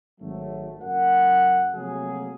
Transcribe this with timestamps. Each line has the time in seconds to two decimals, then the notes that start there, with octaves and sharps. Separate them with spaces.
0.21 G#1 F#3 A3
0.82 F#1 F#2 A#4 F#5
1.73 C3 F3 F#3 A3 A#3 G#4